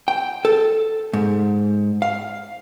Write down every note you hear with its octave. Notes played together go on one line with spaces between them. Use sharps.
G5
A4
G#2
F5